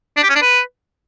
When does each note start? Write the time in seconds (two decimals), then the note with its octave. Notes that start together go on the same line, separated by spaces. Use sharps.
0.17 D4
0.23 G4
0.29 C#4
0.36 D4
0.42 B4